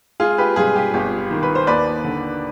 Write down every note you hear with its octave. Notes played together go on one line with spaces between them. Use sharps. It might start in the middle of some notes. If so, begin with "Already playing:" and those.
G#3 F4 G#4
G4 B4
G2 F4 G#4
G4
G1 G4
D#3
B4
C5
D#2 B4 D5
D3